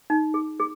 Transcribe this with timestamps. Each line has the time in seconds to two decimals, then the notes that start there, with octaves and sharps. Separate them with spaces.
0.10 D#4
0.34 G#4
0.60 G#4